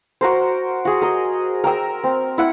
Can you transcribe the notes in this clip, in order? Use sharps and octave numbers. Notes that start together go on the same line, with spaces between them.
F#4 A#4 C5
F#4 G#4
A#4 D#5
A#4 G5 E6
C4
E4 F#5